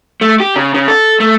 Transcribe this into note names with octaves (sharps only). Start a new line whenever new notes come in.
A3
G4
C#3
C#3
A4
A3